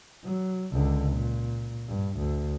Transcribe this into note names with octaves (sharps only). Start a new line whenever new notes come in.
F#3
C#2 D3
A#2
G2
D2